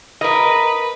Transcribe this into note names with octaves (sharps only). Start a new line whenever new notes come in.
A#4 B4 D#5